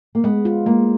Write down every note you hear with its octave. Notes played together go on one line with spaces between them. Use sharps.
A#3
G#3 B3
F4
G#3 A#3